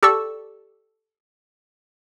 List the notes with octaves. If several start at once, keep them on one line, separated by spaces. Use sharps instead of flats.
G4 A4 D5 A5 C#6 E6